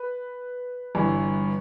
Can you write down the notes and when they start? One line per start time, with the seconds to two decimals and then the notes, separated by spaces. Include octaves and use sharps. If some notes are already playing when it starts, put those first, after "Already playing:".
Already playing: B4
0.95 G1 G2 E3